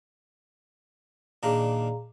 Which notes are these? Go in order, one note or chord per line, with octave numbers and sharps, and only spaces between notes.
A#2 D#3 D4 G#4 F5 A#5